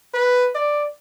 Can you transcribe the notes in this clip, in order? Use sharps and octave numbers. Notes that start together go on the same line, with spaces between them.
B4
D5